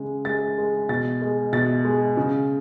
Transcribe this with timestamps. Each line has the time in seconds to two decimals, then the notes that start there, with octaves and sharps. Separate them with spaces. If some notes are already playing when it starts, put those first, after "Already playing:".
Already playing: C#3 G#3
0.25 G#3 A6
0.58 G#3
0.89 B2 A6
1.22 G#3
1.53 B2 A6
1.85 G#3
2.17 C#3